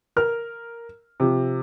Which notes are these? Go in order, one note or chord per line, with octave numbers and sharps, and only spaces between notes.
A#4 F6
C3 F3